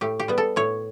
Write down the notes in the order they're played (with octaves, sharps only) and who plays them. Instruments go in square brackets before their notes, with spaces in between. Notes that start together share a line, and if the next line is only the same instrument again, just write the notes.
[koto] A2 G4
G4
G3 B3
A4
A2 C#5